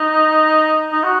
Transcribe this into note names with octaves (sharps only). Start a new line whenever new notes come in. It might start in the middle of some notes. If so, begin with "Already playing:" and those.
Already playing: D#4
D#4
F#4